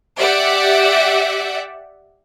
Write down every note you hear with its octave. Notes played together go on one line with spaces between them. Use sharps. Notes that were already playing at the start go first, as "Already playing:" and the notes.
G4 D5 E5 F#5